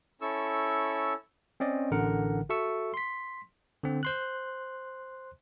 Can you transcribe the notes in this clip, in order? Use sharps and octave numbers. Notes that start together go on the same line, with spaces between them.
C#4 E4 A4 C#6 E6
C4 C#4 D5 D#5
A1 D3 A#4 F#5
F#4 A4 E5 C#6 E6
C6 B6
D3 C4
C5 C6 F#6